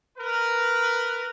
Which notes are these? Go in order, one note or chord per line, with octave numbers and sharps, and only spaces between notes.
A#4 B4